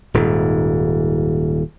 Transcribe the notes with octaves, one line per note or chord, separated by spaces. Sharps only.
D#1 G#2